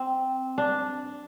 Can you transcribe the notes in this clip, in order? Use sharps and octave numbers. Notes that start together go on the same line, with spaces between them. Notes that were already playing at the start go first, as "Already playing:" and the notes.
Already playing: C4
D4